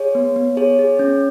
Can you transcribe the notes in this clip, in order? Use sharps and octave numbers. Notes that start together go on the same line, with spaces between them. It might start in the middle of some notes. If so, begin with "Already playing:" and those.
Already playing: G#4 C#5
B3
B3
G#4 C#5
G#4
C#4